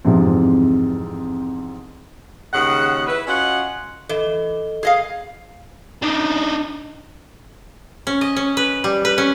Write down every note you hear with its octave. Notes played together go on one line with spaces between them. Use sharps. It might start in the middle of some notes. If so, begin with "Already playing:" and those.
G1 F2 G#2 C3 E3 F3
D#2 C#3 G#3 F#5
E4 B4
C#4 F4 F#4 D#5 F#5
E3 A4 D#5 G7
G#4 D#5 F5
D4 D#4
C#4
D#5
C#4
B4
G3
B4
C#4